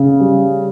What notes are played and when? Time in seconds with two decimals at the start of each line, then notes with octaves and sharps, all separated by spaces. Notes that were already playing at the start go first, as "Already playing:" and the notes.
Already playing: C#3
0.20 G3